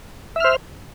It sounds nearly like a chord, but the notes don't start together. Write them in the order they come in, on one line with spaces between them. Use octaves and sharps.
E5 F6 C5